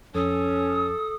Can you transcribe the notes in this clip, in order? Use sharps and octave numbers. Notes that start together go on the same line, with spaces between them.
F2 C#4 A4 D#6